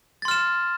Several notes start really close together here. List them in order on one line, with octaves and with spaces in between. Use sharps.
A6 C6 F6 E7